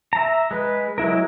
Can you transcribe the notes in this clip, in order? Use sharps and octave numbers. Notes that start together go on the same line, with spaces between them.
E5 A#5
G#3 B4
F#3 G#3 E4 A#4